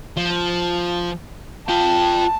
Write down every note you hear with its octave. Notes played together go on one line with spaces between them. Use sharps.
F3
F4 G5 A5